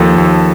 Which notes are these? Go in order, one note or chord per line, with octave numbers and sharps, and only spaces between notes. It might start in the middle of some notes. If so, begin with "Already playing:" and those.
Already playing: D#2 F3 A4
D#2